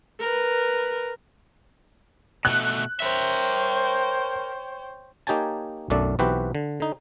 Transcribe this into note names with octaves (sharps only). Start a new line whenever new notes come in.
A#4 B4
B2 A3 F#6
A#4 C5 C#5 E5 G5
A#3 D#4 G4 C#5 G#5 A5
B1 F#2 A3 D4 D5
B1 E3 C4 F#4 G4 B4
D3
D3 D#4